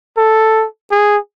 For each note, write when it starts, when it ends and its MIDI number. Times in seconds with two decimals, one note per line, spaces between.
0.18 0.65 69
0.91 1.17 68